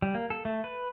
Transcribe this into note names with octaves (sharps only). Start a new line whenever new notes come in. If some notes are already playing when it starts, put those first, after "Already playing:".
G3
A#3
A4
A3
B4